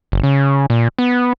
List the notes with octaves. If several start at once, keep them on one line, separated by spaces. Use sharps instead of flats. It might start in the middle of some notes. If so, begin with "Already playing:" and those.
F#1
C#3
A#2
B3